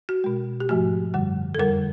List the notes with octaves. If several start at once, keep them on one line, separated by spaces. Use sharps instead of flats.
F#4
B2 G#3
G4
G#2 F3 A3 F#4
F#2 D3 G3
A4
F2 D3 G3 A#4